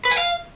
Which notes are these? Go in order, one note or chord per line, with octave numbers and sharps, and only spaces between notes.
B4
G#5
F5